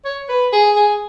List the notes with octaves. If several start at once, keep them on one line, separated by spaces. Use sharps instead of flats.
C#5
B4
G#4
G#4